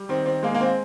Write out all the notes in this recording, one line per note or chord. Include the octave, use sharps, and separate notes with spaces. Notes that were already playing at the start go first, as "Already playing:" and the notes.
Already playing: G3
D#3 C4
D#3 C4
G#3 A#3
A#3
C4